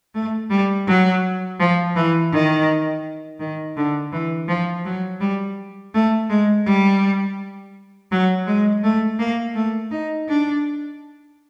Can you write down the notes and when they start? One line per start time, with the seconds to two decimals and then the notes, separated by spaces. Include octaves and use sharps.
0.15 A3
0.50 G3
0.87 F#3
1.60 F3
1.95 E3
2.32 D#3
3.40 D#3
3.77 D3
4.13 E3
4.48 F3
4.85 F#3
5.21 G3
5.94 A3
6.30 G#3
6.65 G3
8.11 F#3
8.47 G#3
8.84 A3
9.19 A#3
9.55 A3
9.91 D#4
10.28 D4